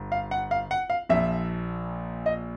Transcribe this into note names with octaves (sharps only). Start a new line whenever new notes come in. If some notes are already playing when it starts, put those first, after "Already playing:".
Already playing: G1
F5
F#5
F5
F#5
F5
A#1 A#2 F3 E5
D#5